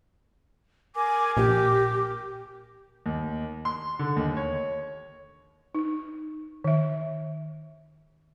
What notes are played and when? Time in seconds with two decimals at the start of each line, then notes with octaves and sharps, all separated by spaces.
0.96 A#4 G#5 D6
1.37 A#1 G4
3.06 D#2
3.65 C6
3.99 D3
4.16 D#2
4.37 C#5
5.75 D#4
6.64 D#3 E5